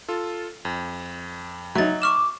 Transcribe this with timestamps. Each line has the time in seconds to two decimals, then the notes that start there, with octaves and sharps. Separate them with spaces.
0.09 F4 A4
0.65 F2
1.75 F#3 D#4 E5 A6
2.02 C#6 D6 F6 E7